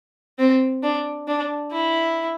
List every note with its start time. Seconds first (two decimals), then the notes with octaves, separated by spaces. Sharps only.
0.38 C4
0.83 D4
1.28 D4
1.72 E4